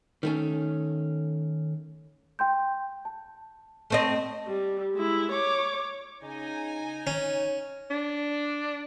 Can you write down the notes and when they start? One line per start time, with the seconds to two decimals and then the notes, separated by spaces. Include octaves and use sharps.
0.23 D#3 A3 C#4
2.39 G5 C6 G6
3.05 A5
3.90 A3 C4 D#5
4.47 G3
4.95 G#3 E4
5.32 C#5 D6
6.23 C#3 D#4 G#5
7.07 C#4 C#5
7.90 D4